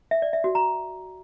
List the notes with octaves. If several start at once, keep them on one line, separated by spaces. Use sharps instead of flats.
E5
D5
E5
F#4
A#5